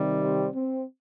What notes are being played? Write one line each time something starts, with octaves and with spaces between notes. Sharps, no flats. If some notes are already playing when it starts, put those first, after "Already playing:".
Already playing: C3 D#3 G3
C4
C4